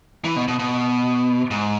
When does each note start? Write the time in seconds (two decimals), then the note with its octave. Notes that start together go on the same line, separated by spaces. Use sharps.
0.25 E3
0.36 B2
0.48 B2
0.59 B2
1.51 G#2